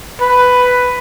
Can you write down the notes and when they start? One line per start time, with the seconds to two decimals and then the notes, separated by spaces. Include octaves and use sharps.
0.21 B4